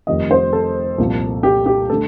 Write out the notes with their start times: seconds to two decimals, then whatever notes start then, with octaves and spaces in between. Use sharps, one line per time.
0.07 F1 F2 D#3 G3 D#5
0.31 C5
0.53 A4
0.98 C2 A#2 F3
1.43 G4
1.66 G4
1.89 D3 A3 A4